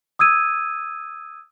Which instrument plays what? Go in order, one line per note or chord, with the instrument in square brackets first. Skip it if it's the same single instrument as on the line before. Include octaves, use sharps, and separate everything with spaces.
[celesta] D#6 E6 G#6 D#7